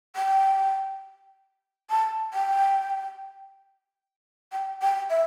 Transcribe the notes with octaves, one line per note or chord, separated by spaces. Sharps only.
G5
A5
G5
G5
G5
E5